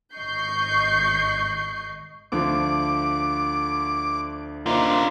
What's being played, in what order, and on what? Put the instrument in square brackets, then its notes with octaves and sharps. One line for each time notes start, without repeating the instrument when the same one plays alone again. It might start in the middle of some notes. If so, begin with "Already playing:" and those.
[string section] G#1 D#5 C#6 G6 C7
[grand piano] D2 D3 F3 [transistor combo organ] D6
[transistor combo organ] A#3 D4 C5 [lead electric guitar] D#4 F4